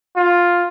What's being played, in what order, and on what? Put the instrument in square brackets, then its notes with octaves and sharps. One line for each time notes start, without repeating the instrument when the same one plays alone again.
[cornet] F4